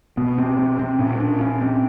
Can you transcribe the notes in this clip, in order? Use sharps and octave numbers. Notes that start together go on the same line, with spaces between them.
B2 B3
C4
C4
C4
A#2 C#4
D4
C#4
C4